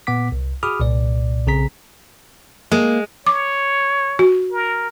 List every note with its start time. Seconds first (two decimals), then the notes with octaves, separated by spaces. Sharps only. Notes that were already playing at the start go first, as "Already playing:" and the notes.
0.07 A#2 B3 F#5 D6 B6
0.32 C2
0.63 F#4 G#4 B5 D6 D#6 F6
0.80 C2 A#2 D5
1.47 B1 C#3 C4 G#4 A#5 B6
2.72 G#3 A#3
3.27 C#5 D6
4.19 F#4
4.51 A#4